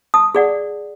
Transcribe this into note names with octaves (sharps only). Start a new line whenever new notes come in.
A5 D#6
G#4 D5 F#5